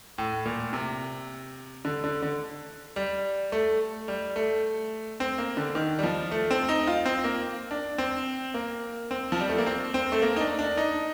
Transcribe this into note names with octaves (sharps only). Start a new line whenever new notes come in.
A2
A#2
C3
D3
D3
D3
G3
A3
G3
A3
C4
A#3
D3
D#3
G3
F3
A3
C4
D#4
F4
C4
A#3
D4
C4
A#3
C4
F3
G3
A3
A#3
C4
C4
A3
A#3
D#4
D4
D4
D#4